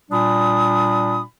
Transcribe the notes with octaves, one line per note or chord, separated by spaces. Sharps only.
A#2 G3 D4 B5 D#6